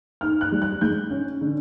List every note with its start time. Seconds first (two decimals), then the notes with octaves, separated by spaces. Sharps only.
0.21 D#4 F6
0.41 F#6
0.52 G3
0.62 F#6
0.81 G#3 G6
1.11 C#4
1.41 D3